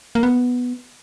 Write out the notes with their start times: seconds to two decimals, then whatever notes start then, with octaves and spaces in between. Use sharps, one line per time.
0.15 A#3
0.23 B3